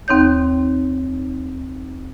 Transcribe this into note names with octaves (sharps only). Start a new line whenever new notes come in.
D#2 C4 D#4 C#5 G6